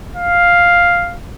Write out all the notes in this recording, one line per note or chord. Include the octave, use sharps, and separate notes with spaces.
F5